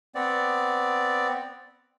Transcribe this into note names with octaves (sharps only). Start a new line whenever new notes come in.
B3 C4 D5